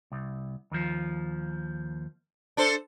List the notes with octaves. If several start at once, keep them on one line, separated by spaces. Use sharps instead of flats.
C2
D#2 F3
D4 A4 C5